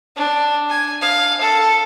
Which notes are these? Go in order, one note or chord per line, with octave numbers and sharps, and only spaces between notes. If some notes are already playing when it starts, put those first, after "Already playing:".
D4
G#5
F5
A4